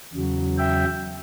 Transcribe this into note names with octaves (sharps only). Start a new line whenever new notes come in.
E2 C#3 F#3
E5 G5